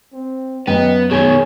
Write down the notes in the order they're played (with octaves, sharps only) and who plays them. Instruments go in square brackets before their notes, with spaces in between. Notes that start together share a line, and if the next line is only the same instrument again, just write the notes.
[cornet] C4
[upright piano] F#2 G5 [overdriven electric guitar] B3 [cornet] D#5
[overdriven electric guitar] B2 D#3 [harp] G#4 [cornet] C#5